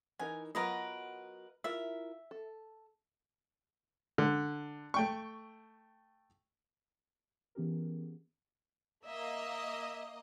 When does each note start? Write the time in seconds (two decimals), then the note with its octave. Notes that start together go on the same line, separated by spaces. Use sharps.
0.19 E3 D#4 A#4 G#5
0.55 F#3 B3 F4 A#4 B4 D#5
1.64 E4 F4 A#4 E5
2.31 A4
4.18 D3
4.94 A3 G5 C#6
7.55 E3 B3 C#4 G4 G#4 A#4
9.05 A#3 D#5 E5